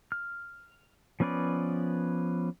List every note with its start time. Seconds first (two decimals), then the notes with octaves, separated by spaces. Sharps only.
0.12 F6
1.20 F3 B3 C#4 B4 D5